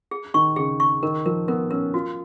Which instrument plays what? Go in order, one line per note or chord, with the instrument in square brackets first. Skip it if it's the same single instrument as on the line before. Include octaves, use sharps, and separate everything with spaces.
[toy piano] G#4
[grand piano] D#3 [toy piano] C#6
[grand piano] C#3 [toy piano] G#4
[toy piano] C#6
[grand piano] D#3 [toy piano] A#4
[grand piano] F3 [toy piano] A#4
[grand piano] B3 [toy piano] A#4
[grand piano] C#4 [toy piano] A#4
[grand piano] F4 [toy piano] F#4